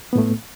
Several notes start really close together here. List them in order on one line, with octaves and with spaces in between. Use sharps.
B3 A2 A3